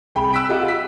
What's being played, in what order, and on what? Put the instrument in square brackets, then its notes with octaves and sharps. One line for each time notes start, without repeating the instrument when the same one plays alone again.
[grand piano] C2 G#4 G5 B5
E6 F#6 B6 D7
F4 G4 D#5 F5 F#5
E6 B6